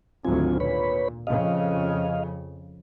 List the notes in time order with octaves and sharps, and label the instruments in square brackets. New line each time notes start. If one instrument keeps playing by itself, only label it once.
[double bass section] G#1 D2 F#3 [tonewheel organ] C4 F4 G#5
[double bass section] A#2 [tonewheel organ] B4 C#5 B5
[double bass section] F2 C#3 [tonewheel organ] D#5 F5